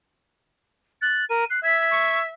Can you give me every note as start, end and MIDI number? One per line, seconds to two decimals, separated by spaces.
1.02 1.24 90
1.02 1.25 93
1.29 1.44 70
1.29 1.47 99
1.50 1.61 90
1.50 1.59 96
1.63 2.31 76
1.63 2.22 92
1.63 1.84 95
1.91 2.19 85